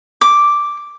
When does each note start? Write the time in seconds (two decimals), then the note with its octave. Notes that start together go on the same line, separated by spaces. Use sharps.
0.21 D6